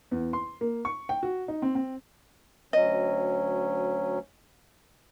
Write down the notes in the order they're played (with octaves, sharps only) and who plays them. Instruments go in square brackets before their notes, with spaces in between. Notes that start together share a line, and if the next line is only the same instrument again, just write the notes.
[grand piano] E2
C6
A#3
C#6
G5
F#4
D#4
C4
C4
[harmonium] D2 F#3 C#4 [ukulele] D#5